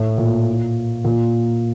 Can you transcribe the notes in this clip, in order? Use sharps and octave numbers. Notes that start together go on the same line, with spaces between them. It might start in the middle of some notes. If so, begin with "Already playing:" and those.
Already playing: A2
A#2
A#2